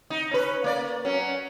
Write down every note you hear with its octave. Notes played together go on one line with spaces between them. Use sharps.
D#4
C#4 B4
A#3 D5
F#3 C#4